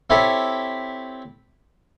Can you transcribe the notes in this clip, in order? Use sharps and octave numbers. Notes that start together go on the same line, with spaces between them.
C4 E4 G4 A4 C#5 E5